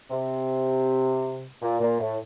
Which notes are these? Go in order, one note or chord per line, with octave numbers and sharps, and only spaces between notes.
C3
A#2
A#2
A2